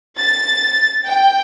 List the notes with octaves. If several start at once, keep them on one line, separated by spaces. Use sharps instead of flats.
A6
G5